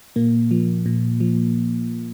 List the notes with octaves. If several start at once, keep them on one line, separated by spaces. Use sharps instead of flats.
A#2 A#3
F3
A#2
F3